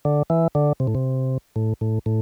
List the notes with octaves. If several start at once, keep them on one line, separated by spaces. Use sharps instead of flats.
D3
E3
D3
C3
A2
C3
A2
A2
A2